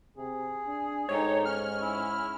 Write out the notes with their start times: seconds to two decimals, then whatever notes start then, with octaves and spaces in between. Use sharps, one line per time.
0.17 C3 G#4
0.67 D4
1.09 G#2 D#4 G4 A4 C#5
1.45 C#4 F6
1.81 E4